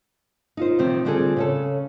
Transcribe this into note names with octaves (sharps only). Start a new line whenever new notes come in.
D#4 F4 C5
C3 D#3 F3 C4
D3 G3 C4 F4 G#4 A4
C#3 C#4 A4